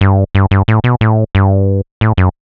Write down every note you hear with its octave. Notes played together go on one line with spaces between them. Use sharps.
G2
G2
G2
A2
B2
A2
G2
A2
F#2